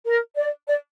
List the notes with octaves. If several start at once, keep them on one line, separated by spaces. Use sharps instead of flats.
A#4
D5
D5